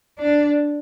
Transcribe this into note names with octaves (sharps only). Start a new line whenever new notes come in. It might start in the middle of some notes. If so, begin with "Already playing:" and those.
D4